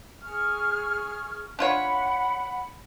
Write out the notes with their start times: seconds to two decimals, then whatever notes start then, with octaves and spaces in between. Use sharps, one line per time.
0.22 G#4 C#6 F6
1.59 D4 F4 C#5 F#5 B5